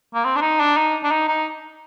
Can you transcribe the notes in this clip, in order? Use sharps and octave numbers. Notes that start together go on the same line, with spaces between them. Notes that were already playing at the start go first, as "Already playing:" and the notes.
A#3
C4
D4
D#4
D4
D#4
D4
D#4
D#4